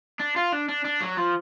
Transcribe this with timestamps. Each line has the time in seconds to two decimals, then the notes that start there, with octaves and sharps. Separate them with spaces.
0.20 D4
0.36 F4
0.53 D4
0.69 D4
0.85 D4
1.02 F#3
1.18 F3